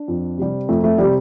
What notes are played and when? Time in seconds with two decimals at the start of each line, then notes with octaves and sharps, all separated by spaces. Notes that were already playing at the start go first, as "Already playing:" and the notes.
Already playing: D4
0.08 F2
0.38 C3 G3
0.69 F2 A3
0.84 A3
0.98 C3 G3